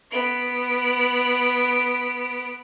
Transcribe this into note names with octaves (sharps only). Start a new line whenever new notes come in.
B3 D7